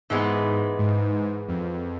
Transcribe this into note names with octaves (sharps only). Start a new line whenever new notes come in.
G#2 E3 G#3 B3
G#2
F2